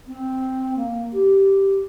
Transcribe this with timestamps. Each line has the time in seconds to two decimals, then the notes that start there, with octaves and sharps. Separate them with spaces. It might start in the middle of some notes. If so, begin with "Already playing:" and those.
0.07 C4
0.76 A#3
1.13 G4